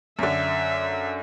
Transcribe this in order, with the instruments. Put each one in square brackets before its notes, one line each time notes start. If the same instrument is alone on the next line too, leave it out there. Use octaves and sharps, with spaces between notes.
[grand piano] F#2 D3 [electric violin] E5